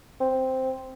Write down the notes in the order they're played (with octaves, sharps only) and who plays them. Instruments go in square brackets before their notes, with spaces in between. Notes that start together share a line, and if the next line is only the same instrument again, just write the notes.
[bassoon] C4